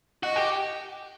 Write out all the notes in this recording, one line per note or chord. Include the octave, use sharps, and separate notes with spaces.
F#4 D#5
G4